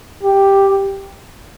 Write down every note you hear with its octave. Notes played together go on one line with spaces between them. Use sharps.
G4